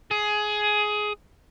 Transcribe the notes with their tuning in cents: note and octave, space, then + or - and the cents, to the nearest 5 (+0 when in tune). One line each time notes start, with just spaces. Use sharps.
G#4 +15